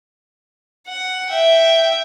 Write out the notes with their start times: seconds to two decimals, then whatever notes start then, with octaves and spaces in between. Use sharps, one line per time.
0.87 F#5
1.29 E5 G5